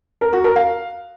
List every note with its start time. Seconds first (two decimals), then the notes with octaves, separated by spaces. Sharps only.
0.21 A#4
0.33 F#4
0.44 A#4
0.56 F5